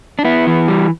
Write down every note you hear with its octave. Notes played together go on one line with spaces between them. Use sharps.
D4
B3 E4
E3
G3